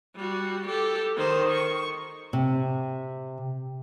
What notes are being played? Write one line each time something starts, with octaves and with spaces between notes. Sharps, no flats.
G3 F#4
G4 A4
D#3 C5
C#6
C3